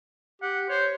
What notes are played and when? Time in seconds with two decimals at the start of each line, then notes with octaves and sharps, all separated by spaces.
0.42 G4 F#5
0.70 C5 C#5